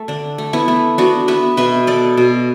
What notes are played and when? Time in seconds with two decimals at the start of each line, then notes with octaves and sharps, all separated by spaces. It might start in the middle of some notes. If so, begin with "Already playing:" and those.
Already playing: A3
0.08 D3 D4
0.38 A3
0.53 B3 E4
0.68 A3
0.98 B3 D4 F#4
1.28 B3 B4 E5
1.57 B2 B4 E5
1.87 B3 A4 D5
2.17 B2